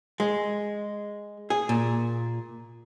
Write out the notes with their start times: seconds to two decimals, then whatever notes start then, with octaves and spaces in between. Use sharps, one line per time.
0.20 G#3
1.50 G#4
1.69 A#2